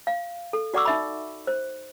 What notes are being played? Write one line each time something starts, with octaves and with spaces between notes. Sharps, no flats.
F5
A4
F#4 D5 F#5 C#6 D6 E6
D#4 E5 B5
C5